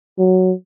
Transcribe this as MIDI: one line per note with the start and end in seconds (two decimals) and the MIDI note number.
0.18 0.52 54